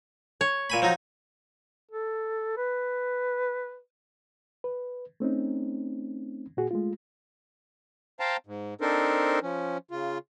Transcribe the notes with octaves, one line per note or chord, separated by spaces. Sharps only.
C#5
A#2 G#5 B5
F3 F#3 D#4
A4
B4
B4
A3 C4 C#4 D#4
A#2 F#4 G#4
G#3 A3 F4
C5 F5 G5 A5 A#5
G#2
C4 D4 D#4 A4 A#4 C5
F3 C#4
C#3 F4